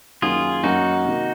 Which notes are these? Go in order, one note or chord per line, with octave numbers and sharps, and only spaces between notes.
F#2 D#3 F#3 A#3 C#4 F4 G#4
F#2 D#3 F#3 A#3 C#4 D#4 F#4
C3 D#3 A#3